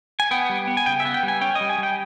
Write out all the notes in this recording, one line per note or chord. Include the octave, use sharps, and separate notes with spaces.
G#5
B3 G5
G3
B3
G#5
C#3 G5
E5
B3
G5
G3
G#5
C#4 G5
D#5
G3
G#5
G3 G5